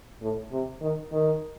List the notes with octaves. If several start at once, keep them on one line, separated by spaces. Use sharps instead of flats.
A2
C3
D#3
D#3